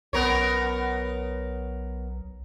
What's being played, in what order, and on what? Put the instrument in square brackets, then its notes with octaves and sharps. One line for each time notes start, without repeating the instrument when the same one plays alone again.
[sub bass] B1 [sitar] B3 A#4 C#5